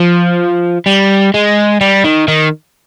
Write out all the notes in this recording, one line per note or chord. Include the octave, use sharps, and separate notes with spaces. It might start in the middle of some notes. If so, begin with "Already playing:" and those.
Already playing: F3
G3
G#3
G3
D#3
D#3